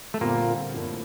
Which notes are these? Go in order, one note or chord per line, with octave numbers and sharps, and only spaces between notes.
A3
A#2 D3 G3 A#3 C4 F4
A2 F3 A#3